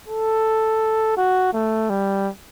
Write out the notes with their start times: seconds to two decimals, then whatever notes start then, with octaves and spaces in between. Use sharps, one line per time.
0.08 A4
1.17 F#4
1.53 A3
1.90 G3